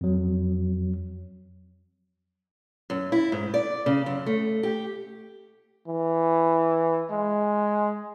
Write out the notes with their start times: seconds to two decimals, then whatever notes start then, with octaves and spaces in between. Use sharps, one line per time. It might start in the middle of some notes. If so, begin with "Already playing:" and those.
0.01 F2 F#3
2.90 F#2
3.12 E4
3.32 G#2
3.54 D5
3.86 C#3
4.06 F#2
4.26 A3
4.63 G4
5.88 E3
7.11 G#3